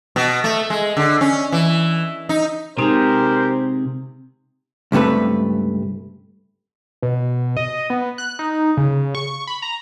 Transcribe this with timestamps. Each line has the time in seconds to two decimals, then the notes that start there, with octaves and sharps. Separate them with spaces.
0.16 B2
0.44 A3
0.70 G#3
0.97 D3
1.21 C#4
1.52 E3
2.29 D#4
2.78 C3 G#3 C4 D#4 G4 G#4 A#4 C5
4.92 C#2 G2 C3 A3 B4
7.02 B2
7.57 D#5
7.90 B3
8.18 F#6
8.39 D#4
8.77 C#3
9.15 C#6
9.47 B5
9.62 A#5